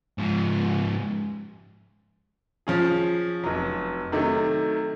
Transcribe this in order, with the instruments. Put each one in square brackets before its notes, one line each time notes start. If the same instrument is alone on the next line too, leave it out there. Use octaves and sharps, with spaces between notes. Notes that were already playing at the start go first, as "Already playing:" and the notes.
[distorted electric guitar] G#2 F3
[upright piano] F3 C#4 G#4
F1 F#3
C3 D#3 F#3 A3